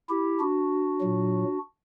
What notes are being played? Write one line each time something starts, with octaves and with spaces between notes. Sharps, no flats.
E4 G4
D4 F#4
A#2 F#3